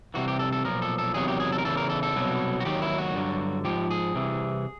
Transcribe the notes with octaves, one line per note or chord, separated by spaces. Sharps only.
C2 C3 E3 F#4
G4
A4
A4
B1 A#2 F3 A#4
A4
A4
E2 C3 D#3 F#3 G#4
G4
G#4
A4
A#4
E2 C#3 E3 A4
A#4
A4
A4
C2 B2 F#3
F#4
D#2 D#3 F#3 G4
E4
F#4
G2 D3 F#3
G#2 F3 G4
G#4
C2 C3 E3